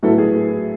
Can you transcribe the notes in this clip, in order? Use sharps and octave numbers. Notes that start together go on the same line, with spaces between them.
A2 F#3 B3 E4 F#4 A4
G#4